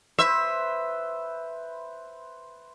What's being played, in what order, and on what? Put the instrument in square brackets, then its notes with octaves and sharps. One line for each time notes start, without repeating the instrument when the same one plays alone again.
[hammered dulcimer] B4 C5 [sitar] E5